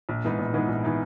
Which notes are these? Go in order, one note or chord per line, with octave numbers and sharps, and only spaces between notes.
A#1
G#2 E3 B3 D#4
A#1
G#2 E3 B3 D#4
A#1
E3 B3 D#4